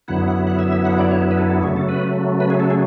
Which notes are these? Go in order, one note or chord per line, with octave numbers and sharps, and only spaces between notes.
F#2 D3 F#3 B3 E4 F#5
F#5
F#5
E5
E5
F#5
D5
C#5
B4
A4
A4
C#3 F#3 A3 G#4
A4
B4
B4
G#4
A4
G#4